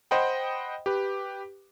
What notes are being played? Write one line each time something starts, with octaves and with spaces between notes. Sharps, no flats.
C5 D#5 F#5 G5 B5
G4 B4